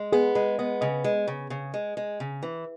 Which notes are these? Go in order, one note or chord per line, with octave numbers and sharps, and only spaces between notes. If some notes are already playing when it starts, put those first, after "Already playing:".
Already playing: G#3
B3 G#4
G#3 B4
B3 D#5
C#3 D#5
G#3
C#3
C#3
G#3
G#3
C#3
E3